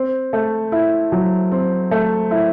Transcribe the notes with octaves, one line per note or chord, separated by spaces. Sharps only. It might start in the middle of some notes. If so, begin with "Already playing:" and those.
Already playing: C4
A3
E4
F#3
C4
A3
E4